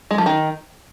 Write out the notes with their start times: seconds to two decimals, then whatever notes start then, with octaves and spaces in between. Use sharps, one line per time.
0.11 G#3
0.18 F3
0.26 D#3